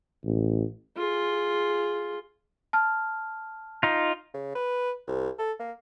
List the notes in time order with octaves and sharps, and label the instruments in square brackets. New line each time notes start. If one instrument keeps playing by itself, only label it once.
[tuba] A1
[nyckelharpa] F4 G#4
[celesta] A5 F6
[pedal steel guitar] D#4 F4
[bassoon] C#3
B4
C2
A4
A#3